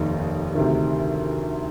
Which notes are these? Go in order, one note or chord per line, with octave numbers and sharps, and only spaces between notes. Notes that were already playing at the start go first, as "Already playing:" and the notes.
Already playing: F1 D#2 D#3 A#3 D#4
D2 C3 D#3